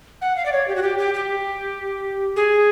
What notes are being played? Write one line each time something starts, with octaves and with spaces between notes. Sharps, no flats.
F#5
F5
D5
C#5
G4
F#4
G4
G4
G4
G#4